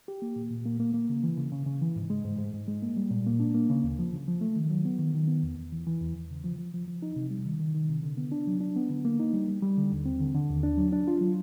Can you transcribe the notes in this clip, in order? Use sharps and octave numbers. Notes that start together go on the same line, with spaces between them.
G4
A#3
A#2
A#2
A#3
A#3
A#3
C#3
E3
C#3
C#3
C#3
E3
G#2
G#3
G#2
G#2
G#2
G#3
A#3
G3
A#2
A#3
D4
A#3
C#3
D2
F3
C#3
F3
A3
D#3
F#3
B3
D#3
D#3
B3
E2
E2
E3
E3
E2
E2
C#3
F3
F3
F3
F3
D#4
C3
G3
D#3
D#3
D#3
C3
D3
B3
D4
F#3
D4
B3
D3
A#3
D#4
G3
G3
G3
D3
D#2
C4
D3
D3
D#2
D4
F#3
D4
F4
F#3